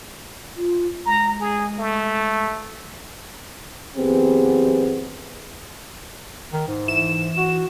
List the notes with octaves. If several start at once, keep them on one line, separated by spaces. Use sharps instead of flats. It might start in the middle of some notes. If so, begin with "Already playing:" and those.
F4
G#3 A#5
G#4
A3
F#2 E3 B3 C4 G4 G#4
D#3
G#2
E3 E7
F#4